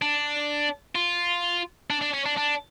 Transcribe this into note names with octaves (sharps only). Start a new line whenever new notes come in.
D4
F4
D4
D4
C#4
D4
D4